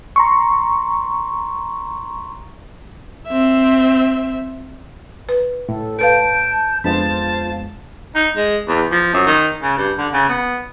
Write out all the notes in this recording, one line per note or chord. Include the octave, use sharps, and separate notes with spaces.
A#5 C6 C#6
C4 E5
B4
A2 A4
A4 B4 F5 A5 G6 D7
F2 G#3 B3 D4 F4 C5 A5
D#4
G#3
E2
F3
F#2
D#3
C#3
G2
D3
C#3
B3